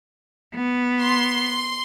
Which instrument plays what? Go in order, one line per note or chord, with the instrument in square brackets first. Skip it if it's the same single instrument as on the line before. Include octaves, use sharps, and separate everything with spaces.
[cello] B3
[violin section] C6